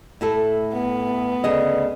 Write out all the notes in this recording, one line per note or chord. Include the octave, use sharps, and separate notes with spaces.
A2 E4 A4
B3
D2 C#3 D#5